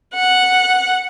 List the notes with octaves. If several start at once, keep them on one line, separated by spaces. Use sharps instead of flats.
F#5